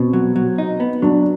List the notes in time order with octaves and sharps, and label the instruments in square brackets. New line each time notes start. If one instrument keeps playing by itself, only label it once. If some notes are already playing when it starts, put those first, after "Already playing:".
Already playing: [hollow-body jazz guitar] B2 [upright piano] C4
[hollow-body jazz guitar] F#3
F#3
D#4
B3
[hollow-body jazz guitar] F#3 [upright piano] D4